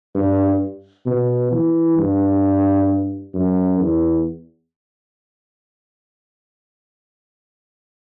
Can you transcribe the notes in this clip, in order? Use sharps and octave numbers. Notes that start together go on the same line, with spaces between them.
G2
B2
E3
G2
F#2
E2